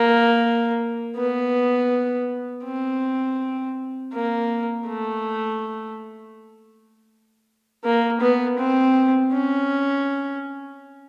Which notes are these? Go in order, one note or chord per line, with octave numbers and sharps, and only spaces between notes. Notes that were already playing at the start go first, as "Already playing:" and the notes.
Already playing: A#3
B3
C4
A#3
A3
A#3
B3
C4
C#4